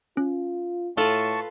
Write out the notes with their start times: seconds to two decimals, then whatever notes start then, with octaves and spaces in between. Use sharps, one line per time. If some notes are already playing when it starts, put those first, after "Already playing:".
0.17 C#4 F4
0.97 A2 F4 A4 B4 A5 C#6